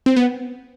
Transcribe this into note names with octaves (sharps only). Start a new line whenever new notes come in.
C4
B3